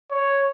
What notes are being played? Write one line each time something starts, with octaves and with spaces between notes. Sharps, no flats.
C#5